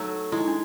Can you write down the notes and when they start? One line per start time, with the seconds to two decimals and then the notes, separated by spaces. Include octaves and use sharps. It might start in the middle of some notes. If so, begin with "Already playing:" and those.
Already playing: F#3 A3 D#4
0.32 G#3 E4
0.40 D#4
0.47 D4